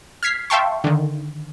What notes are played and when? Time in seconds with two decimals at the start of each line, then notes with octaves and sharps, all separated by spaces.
0.23 F6 G#6 B6 C7
0.50 E5 F5 G5 A5 C6 C#6
0.84 D3 D#3